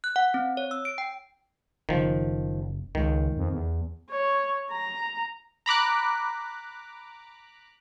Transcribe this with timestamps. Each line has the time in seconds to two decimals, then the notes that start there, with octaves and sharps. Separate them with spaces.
0.04 F#6
0.16 F#5
0.34 C4
0.57 C#5
0.71 E6
0.85 D7
0.98 G5
1.89 F#1 D#3 F3
2.95 C#2 D#3
3.37 F2
3.52 E2
4.10 C#5
4.71 A#5
5.66 A#5 B5 D6 F#6